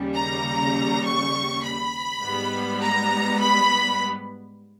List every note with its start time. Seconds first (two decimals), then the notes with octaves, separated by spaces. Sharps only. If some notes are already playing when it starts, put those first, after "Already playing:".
Already playing: D#2 C#3 G3
0.15 A#5
1.04 C#6
1.63 B5
2.22 G#2 G3 B3
2.81 A#5
3.40 B5